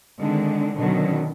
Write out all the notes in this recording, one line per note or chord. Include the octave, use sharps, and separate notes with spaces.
D3 D#3 G#3 C4 D4
B2 D3 D#3 F#3 B3 C#4